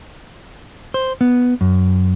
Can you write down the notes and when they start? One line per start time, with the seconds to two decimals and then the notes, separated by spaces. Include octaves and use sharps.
0.94 C5
1.21 B3
1.61 F#2